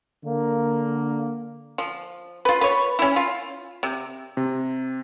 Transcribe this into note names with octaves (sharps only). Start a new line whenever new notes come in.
D3 A#3
F3
F4 B4
B4 C#5
C#4 E4
F4
C3
C3